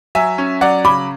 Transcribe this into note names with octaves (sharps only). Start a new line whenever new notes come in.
F#3 E5 G#5
C#4
F#3 D5 F#5
C#3 B5 D6